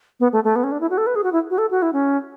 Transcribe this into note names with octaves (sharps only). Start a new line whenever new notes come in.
B3
A3
A3
B3
C#4
D4
E4
F#4
A4
B4
G#4
F#4
E4
F#4
A4
F#4
E4
C#4